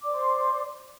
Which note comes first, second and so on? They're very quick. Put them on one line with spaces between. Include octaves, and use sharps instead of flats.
D6 D5 C5 C6